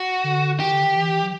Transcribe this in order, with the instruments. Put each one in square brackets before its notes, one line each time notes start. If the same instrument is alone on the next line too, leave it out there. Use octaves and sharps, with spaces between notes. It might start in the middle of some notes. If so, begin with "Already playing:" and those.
Already playing: [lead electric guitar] F#4
[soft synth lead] D3
[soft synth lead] D#3 [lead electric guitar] G4
[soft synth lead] D3
D#3
E3
F#3